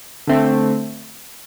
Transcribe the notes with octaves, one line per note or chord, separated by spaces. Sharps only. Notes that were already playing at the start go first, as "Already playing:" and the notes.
D3 A3 C4